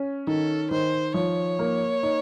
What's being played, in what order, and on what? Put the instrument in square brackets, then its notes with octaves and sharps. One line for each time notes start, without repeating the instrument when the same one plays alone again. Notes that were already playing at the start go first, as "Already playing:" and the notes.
Already playing: [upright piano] C#4
[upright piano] D#3 [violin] A4
[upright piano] D#3 [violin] C5
[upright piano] F3 [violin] C#5
[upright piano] A#3
D#4